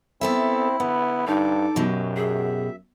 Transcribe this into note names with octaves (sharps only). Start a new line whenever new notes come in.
B3 C4 E4 A4 E5
D3 B3
G2 D#4 A4 D6
F#2 B2 F#3 G4
G#4 E5